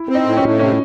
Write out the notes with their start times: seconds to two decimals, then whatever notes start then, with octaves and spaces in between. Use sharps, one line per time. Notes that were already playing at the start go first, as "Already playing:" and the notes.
Already playing: E4
0.09 C4
0.15 D#4
0.26 A2
0.37 C#4
0.43 A2
0.59 C3 C#4